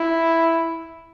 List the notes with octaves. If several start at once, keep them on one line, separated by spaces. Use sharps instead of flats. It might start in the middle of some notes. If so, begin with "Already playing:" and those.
Already playing: E4